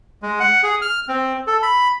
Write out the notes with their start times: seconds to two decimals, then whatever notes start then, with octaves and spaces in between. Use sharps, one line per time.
0.22 G#3
0.40 F#5
0.63 G#4
0.82 F6
1.08 C4
1.47 A4
1.62 B5